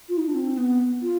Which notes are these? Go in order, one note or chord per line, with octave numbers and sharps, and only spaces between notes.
F4
D#4
D4
C4
B3
F4